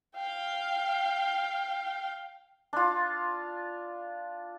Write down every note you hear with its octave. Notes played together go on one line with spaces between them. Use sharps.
F5 G5
D4 F4